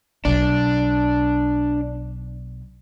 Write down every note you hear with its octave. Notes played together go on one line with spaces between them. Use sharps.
B1 D4